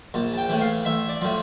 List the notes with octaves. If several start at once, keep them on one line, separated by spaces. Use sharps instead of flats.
A#1 A5
A5
G5
A2 E3
F5
A1 E5
D5
A2 F3